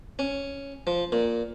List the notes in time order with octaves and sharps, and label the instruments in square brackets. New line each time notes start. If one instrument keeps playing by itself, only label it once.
[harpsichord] C#4
F3
A#2